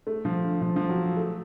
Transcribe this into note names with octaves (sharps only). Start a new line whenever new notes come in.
A3
F3
D3
F3
F3
F#3
A3